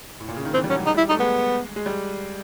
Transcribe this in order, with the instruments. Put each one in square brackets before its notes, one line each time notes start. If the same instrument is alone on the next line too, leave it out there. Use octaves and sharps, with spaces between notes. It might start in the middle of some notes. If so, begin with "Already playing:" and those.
[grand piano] A2
A#2
C#3
D#3
[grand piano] E3 [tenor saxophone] C4
[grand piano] G3
[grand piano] F#3 [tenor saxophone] C#4
[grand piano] G3
[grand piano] G#3 [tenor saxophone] D#4
[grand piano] G3
[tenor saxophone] E4
[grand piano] A3 [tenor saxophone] D#4
[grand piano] G#3 [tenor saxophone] B3
[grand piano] G#3
G3